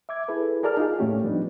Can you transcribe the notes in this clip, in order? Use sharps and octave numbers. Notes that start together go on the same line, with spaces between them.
E5 D6 G#6
E4 G#4 A4 B4
F#4 G#4 A#4 D5 A5 F6
D#4 F4 G#4
A2 A3 C#4 G4
F3 G3 B3 D4 D#4